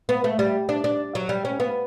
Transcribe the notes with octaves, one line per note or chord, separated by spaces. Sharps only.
B3
A3
G3
D4
D4
F#3
G3
C#4
B3